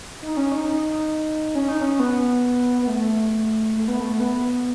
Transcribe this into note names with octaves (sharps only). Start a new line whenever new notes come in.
D#4
C#4
D#4
D#4
C#4
D#4
C#4
B3
B3
A3
A3
B3
A3
B3